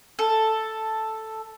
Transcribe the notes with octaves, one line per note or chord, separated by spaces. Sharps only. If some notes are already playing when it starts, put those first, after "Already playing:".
A4